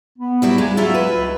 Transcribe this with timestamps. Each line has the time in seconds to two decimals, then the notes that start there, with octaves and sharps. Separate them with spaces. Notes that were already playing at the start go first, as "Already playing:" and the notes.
0.19 B3
0.42 F#3 G3 E4
0.58 D#2 C3 G#3 G#5
0.77 F#3 E4 F4 E5
0.94 B4
1.11 C#2